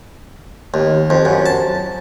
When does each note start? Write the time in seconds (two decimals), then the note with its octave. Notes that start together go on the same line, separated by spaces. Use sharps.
0.74 D#2
1.10 F2
1.25 F#2
1.46 A5